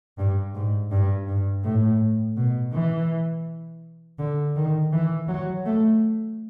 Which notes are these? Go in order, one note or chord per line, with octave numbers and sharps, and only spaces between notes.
G2
G#2
G2
G2
A2
B2
E3
D3
D#3
E3
F#3
A3